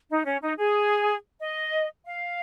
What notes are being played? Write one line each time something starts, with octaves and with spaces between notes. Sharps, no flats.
D#4
C#4
D#4
G#4
D#5
F5